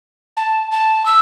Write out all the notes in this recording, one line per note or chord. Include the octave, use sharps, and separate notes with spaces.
A5
A5
E6